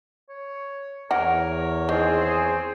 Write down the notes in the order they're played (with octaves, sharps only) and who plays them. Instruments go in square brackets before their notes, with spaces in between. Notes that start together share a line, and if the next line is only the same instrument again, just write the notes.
[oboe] C#5
[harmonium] E2 C#5 [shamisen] E3 F#5 [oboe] A#4
[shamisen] D#3 [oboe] C4 [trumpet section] G#4 C5